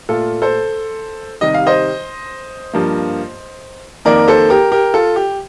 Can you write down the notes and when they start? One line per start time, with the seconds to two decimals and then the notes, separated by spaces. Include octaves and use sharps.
0.09 A#2 A3 F4 A4
0.42 A4 C5
1.41 C3 D#3 G3 D#5
1.54 F5
1.67 C5 D#5
2.73 G2 F3 A#3
4.05 F2 D#3 A#3 A#4 D5
4.28 A4 C5
4.50 G4 A#4
4.72 G4 A#4
4.94 F4 A4
5.16 G4